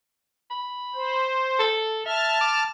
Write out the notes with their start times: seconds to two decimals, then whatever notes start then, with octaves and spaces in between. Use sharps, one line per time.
0.50 B5
0.95 C5
1.59 A4
2.06 E5 A5 F6
2.41 D6